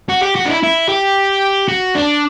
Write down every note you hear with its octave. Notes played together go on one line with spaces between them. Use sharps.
F#4
G4
F#4
D4
E4
E4
G4
F#4
D4